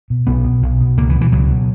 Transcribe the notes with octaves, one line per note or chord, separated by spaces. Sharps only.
B2
B1 B3
B2
B1
B2
C#2 A#3
E3
B2
E3
C#2 F#3
B2